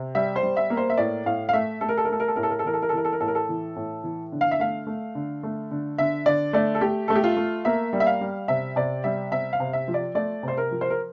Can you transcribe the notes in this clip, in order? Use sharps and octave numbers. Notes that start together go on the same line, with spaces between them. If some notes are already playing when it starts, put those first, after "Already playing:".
Already playing: C3
G3 E5
C5
G3
E5
A#3
C5
E5
A2 D5
A2 F5
F5
A3 E5
A3 A4
A#4
A4
A#4
A3 A4
A#4
A4
A2 A#4
A4
A#4
A4
E3 A#4
A4
A#4
A4
E3 A#4
A4
A#4
A2 A4
A#4
A4
E3
A2
E3
D3
F5
E5
A3 F5
A3
D3
A3
D3
D3 E5
D3 D5
A3 D5
A4
A3 G4
A3 A4
G4
F4
A3
A#3 E5
G3
E5
F5
G3
C3 E5
C3 D5
G3 E5
C3 E5
F5
C3
E5
F3
D5
A3 D5
C3 C5
A#4
F3
C5
A#4